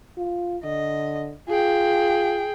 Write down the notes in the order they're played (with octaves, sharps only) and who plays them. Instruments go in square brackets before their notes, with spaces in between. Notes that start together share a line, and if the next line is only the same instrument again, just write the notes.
[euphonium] F4
[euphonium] D3 [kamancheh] D#5
[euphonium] F4 [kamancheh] G#4 G5